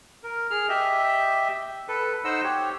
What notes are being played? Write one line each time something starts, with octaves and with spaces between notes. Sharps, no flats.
A#4
G#4 F6
G4 D#5 E5
A4 B4
D#4 C5 D#5 F#5 E6
G4 C#5